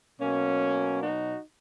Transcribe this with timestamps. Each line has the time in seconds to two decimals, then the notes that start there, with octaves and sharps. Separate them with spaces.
0.20 B2 F#3 A#3 C#4
1.01 D#4 F#4